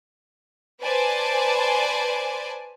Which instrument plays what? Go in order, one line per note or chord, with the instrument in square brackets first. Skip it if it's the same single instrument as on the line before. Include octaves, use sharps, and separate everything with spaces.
[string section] B4 C5 D5 G#5 A5